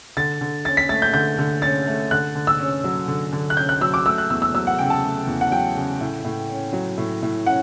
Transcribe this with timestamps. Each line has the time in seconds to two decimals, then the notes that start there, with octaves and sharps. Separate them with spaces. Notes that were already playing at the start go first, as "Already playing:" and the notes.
0.17 D3 A6
0.41 D3
0.65 C#4 A6
0.77 B6
0.89 A3 A6
1.02 G6
1.14 D3 G6
1.38 D3
1.62 C#4 A6
1.87 A3
2.11 D3 F#6
2.35 D3
2.47 E6
2.59 C#4
2.84 F#3
3.08 D3
3.33 D3
3.50 F#6
3.57 C#4 G6
3.69 F#6
3.81 F#3 E6
3.94 D6
4.05 A3 E6
4.18 F#6
4.30 E2 E6
4.42 E6
4.54 F#3 E6
4.67 F#5
4.79 C#3 G5
4.90 A5
5.04 A3
5.27 E2
5.41 F#5
5.51 F#3 G5
5.76 C#3
6.01 A2
6.24 A2
6.49 C#4
6.73 F#3
6.98 A2
7.22 A2
7.46 C#4 F#5